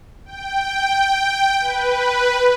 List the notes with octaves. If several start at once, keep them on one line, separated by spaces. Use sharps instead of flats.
G5
B4